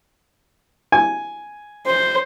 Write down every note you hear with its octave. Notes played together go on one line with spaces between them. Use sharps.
G#5
C5